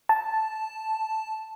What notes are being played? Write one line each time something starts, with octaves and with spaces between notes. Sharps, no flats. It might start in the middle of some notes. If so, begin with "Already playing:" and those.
A5